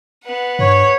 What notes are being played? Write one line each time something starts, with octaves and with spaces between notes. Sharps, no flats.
B3 F#5
G2 C#5